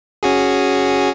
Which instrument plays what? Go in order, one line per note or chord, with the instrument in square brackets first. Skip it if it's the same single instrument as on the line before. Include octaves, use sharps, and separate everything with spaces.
[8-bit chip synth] C#4 F#4 G#4